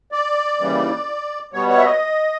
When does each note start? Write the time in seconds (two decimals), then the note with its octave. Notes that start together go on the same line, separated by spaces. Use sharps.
0.12 D5
0.58 D#2 C#3 E3 G3
1.53 B2 G3 B3 C#5
1.69 C#5
1.77 E5
1.84 D#5